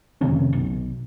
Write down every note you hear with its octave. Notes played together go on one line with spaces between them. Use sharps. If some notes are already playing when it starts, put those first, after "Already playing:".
F1 C3 D#3 C#4
B1